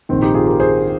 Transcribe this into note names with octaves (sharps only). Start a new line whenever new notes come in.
A#1 G#2 D#3 C4
D#4 G4
F4 G#4
G4 A#4
G#4 C5